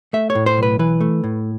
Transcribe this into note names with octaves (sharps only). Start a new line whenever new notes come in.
A3 E5
C#5
A2
C5
B1
B4
E3 B4
A3
A2